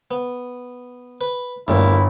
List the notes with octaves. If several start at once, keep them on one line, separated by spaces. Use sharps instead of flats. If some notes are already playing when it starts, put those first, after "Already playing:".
B3
B4
G1 D2 G2 A#2 E4